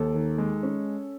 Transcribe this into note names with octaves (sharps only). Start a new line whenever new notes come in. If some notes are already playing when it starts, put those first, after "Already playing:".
Already playing: D#2 A4
D#3
G#3
C#4